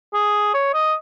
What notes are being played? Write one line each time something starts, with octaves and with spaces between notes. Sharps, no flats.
G#4
C#5
D#5